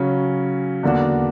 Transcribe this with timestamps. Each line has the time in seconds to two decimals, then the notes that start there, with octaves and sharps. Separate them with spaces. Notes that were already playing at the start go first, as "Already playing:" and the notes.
Already playing: C#3 F#3 C#4
0.83 E2 D3 A#3 D4 F#4